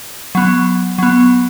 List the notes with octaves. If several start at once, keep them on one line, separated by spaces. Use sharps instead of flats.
F#3 B3
F#3 B3